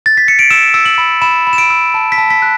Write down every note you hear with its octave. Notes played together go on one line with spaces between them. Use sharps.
A6
B6
C#7
D7
E6 E7
E6
F#7
B5
B5 E7
B5
E7
D7
E6
A5
B6
A5
B6
F#6